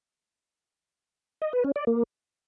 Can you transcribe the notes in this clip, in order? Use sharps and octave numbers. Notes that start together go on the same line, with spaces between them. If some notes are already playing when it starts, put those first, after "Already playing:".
D#5
B4
C#4
D5
A#3